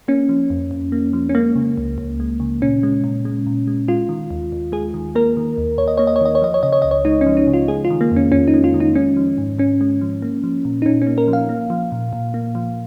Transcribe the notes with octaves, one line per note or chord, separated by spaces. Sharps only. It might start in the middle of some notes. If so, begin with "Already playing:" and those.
A#3 C#4
F3
F2
F2
A#3
F3
C#4
G#3 A#3
C#3
C#2
C#2
G#3
C#3
A#2 C#4
G#3
A#2
G#3
A#2
G#3
G#3 F4
D#3
D#2
D#2
G#3 G#4
D#3
A#3 A#4
D#3
D#2
D#2 C#5
D#5
A#3 C#5
D#5
C#5
D#3 D#5
C#5
F3 D#5
C#5
C#3 D#5
C#5
C#2 D#5
C#5
G#3 D#4
C#4
F3
D#4
C#3
F4
G#3 G#4
F4
D#3
A#3
F2 C#4
F2 C#4
D#4
G#3
F4
D#3
D#4
G#3 C#4
F3
G#2
G#2 C#4
G#3
F3
A#3
F3
A#2
D#4
A#2 C#4
C#4
A#3
A#4
F3
F5
A#3
F3
A#2
A#2
A#3
F3